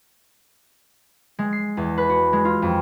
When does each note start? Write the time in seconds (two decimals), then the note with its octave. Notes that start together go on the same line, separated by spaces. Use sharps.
1.39 G#3
1.53 C7
1.77 E2
1.98 B4
2.09 F#4
2.33 G#3
2.45 F4
2.62 F2